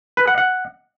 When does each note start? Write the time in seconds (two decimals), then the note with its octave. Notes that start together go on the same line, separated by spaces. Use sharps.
0.17 B4
0.27 F#5
0.38 F#5